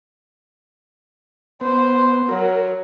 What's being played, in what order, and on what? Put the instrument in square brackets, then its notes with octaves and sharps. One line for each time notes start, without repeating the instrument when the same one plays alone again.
[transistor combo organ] B3 [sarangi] C5
[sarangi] F#3 [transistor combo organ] A#4